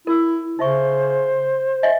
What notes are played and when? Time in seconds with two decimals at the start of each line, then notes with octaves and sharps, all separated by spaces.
0.07 E4 A#4 E6
0.59 C#3 D#4 C5 E5 C#6
1.83 D#5 E5 G#5